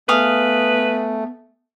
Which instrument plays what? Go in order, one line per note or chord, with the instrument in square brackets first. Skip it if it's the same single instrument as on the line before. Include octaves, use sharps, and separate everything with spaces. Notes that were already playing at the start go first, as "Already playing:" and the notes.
[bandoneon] A3 [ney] B3 [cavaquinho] G#4 F5 D#6 [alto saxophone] B4